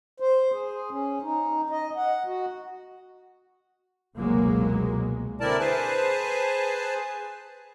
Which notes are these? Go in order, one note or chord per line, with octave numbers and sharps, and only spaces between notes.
C5
G#4
C#4
D#4
D#5
F#5
F#4
F1 C#2 B2 F#3 G#3 A#3
D3 C4 E4 A#4 D5 A5
G#4 B4 C5 G#5 A5